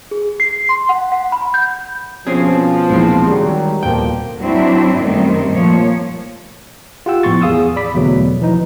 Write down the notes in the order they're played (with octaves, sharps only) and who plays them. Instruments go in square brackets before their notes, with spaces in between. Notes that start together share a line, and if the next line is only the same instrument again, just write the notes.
[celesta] G#4
C7
C6
F#5
F#5
B5
G6
[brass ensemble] B2 F3 [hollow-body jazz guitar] C4 C#4 G#4
[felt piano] A#1 D#2 E3 [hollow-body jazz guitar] G#3 C4
[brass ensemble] D#3 F#3 G3 [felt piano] G#4
[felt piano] D#1 C5 [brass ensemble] B2 F3 A#3 [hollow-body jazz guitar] G5
[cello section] F#3 C4 D4 E4
F#2 D#3 G3 A3 C4
A#2 F3 C#5
[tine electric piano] F4 G4 F#5 G5 E6
A2 F3 B3 C6 C#6 A6
E2 G#4 F5 D#6 E6
D5 B5 D6 B6
E2 B2 D3 E3 F#3 A3
E3 F3 D#4